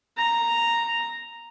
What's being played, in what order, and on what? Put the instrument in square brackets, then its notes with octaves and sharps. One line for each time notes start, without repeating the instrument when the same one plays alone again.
[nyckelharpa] A#5